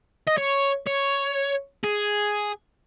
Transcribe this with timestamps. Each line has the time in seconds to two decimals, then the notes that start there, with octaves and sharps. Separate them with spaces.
0.27 D#5
0.37 C#5
0.87 C#5
1.84 G#4